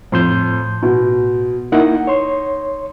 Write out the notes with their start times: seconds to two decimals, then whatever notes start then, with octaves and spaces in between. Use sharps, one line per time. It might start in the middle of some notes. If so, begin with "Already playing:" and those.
0.12 F2 A2 C6 G6
0.82 B2
1.72 A#3 D#4 E4 F#5
2.07 C#5 C6